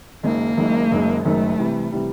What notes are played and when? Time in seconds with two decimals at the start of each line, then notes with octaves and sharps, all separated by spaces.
0.23 F#1 F#2 D#3 G#3 A#3
0.57 F#1 F#2 D#3 G#3
0.91 F#1 F#2 D#3 G#3
1.24 F#1 F#2 D#3 G#3 A3
1.59 C3 E3 G3
1.92 C3 E3 G3